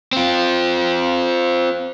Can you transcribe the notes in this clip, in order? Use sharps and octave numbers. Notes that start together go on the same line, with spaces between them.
C4 F4